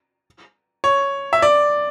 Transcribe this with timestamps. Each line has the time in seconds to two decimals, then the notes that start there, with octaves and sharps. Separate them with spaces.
0.84 C#5
1.33 E5
1.42 D5